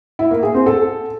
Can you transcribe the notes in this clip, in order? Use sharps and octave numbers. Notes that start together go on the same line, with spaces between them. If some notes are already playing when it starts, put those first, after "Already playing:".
E4
A#3
G#4
C4
A4